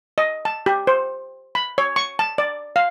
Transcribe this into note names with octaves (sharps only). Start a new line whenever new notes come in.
D#5
A5
G4
C5
B5
C#5
C#6
A5
D5
F5